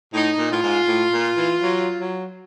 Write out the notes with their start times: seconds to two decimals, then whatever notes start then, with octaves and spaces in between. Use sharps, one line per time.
0.13 A2 D#4
0.38 A#2
0.51 A2 F4
0.62 G#2
0.87 A2
1.13 A#2
1.37 E3
1.62 F#3
1.99 F#3